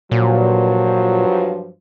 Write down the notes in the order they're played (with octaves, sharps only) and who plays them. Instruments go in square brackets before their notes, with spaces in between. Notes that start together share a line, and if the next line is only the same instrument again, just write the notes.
[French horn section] G2 F3 [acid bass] A#2 [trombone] F#3